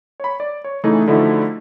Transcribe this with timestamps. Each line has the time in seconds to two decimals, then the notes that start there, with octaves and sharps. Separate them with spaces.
0.20 C#5 B5
0.40 D5
0.64 C#5
0.83 C#3 E3 A3 D#4 G#4
1.07 D3 F3 A3 D#4 E4 F#4